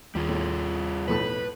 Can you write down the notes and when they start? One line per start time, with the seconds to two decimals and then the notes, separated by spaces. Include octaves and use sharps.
0.15 D#2 G3 F4 G#4
0.28 A2
1.08 B1 F2 A2 B4